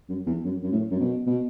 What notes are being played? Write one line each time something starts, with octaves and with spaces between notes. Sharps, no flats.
F#2
E2
F#2
F#2
A2
F#2
B2
B2